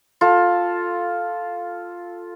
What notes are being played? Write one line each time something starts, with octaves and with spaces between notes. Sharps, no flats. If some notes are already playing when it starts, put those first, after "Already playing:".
F4 A4